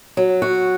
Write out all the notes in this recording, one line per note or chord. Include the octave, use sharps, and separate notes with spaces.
F#3
F#4